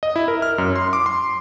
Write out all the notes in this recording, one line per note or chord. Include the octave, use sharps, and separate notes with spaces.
D#5
E4
A#4
F6
F#2
C6
D6
C6